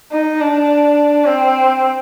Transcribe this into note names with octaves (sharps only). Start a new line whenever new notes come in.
D#4
D4
C4